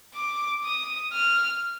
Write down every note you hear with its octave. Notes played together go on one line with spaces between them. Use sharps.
D6
D#6
F6